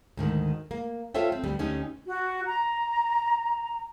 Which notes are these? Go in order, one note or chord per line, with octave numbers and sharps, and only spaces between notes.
D2 G#2 D#3
A#3
F4 A4 C5 C#5 E5 G5
C4
D2 G3 B3
D2 C#4 D#4 G4
F#4
A#5